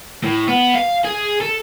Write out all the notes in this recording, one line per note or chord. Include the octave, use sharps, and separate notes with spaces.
A2
B3
F5
G#4
A4